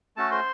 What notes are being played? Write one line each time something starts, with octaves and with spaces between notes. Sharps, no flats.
A3 C#4 F#4 A4 A5
C5 C6